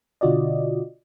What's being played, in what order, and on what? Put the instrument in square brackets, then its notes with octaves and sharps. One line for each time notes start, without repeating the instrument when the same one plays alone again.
[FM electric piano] B2 D3 F4 F#4 D5 D#5